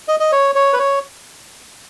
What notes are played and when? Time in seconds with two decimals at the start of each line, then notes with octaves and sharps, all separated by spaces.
0.08 D#5
0.20 D#5
0.32 C#5
0.55 C#5
0.73 B4
0.79 C#5